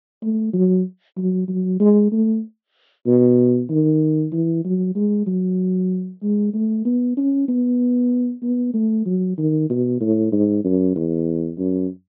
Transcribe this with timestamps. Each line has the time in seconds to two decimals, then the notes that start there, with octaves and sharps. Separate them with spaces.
0.23 A3
0.53 F#3
1.17 F#3
1.48 F#3
1.80 G#3
2.12 A3
3.06 B2
3.70 D#3
4.33 E3
4.65 F#3
4.95 G#3
5.27 F#3
6.22 G#3
6.53 A3
6.85 B3
7.17 C#4
7.48 B3
8.42 B3
8.74 A3
9.06 F#3
9.38 D#3
9.69 B2
10.01 A2
10.32 G#2
10.64 F#2
10.95 E2
11.58 F#2